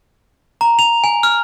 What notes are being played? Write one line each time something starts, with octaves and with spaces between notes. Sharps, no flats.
A#5
F7
G#5
F6